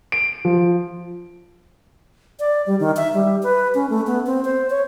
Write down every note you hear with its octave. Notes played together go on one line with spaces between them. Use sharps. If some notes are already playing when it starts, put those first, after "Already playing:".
D7
F3
D5
G3
D#3
E5
G3
B4
C#4
A3
B3
C4
C5
C#5